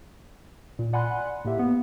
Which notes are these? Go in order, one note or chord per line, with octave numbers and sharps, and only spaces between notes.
A#2
D5 F#5 G#5 B5 C6 F#6
A2 A#3 G4 E5
A#3 B3